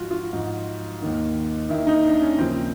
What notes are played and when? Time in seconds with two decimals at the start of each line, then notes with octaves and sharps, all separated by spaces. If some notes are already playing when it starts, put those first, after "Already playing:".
Already playing: G#2 F3 F4 F#4
0.11 F4
0.33 G#2 F3
1.02 D#2 D#3
1.69 D#2 D#3 E4
1.87 D#4
2.04 D4
2.22 C#4
2.38 D#2 C#3 F3 C4